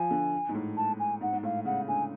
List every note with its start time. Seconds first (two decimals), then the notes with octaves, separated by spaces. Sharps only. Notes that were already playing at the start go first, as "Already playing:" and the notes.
Already playing: F3 G#5
0.11 D3
0.49 G#2
0.55 A2
0.76 A5
0.99 G#5
1.21 G#2 F#5
1.33 G#2
1.43 A2 F5
1.65 C#3 F#5
1.88 D3 G#5